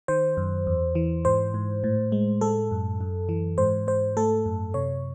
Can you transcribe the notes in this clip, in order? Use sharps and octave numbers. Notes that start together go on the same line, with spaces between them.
D#3 C5
F#2
E2
E3
G#2 C5
G#2
A2
G#3
G#3 A4
F#2
F#2
E3
G#2 C5
G#2 C5
A3 A4
F#2
C3 C#5